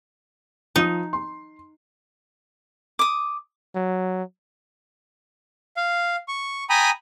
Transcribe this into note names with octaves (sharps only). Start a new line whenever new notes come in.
F3 D#4 D#6
C6
D6 D#6
F#3
F5
C#6
G5 G#5 A#5 B5 D#6